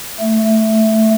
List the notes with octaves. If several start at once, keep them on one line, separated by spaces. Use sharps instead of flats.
A3